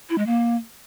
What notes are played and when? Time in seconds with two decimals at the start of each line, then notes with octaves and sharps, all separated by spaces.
0.10 E4
0.18 G#3
0.27 A#3